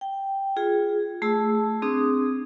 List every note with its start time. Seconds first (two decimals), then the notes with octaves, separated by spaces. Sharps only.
0.01 G5
0.56 F4 G#4
1.22 A3 G#4 A5 E6
1.82 C4 D4 G#4 D#6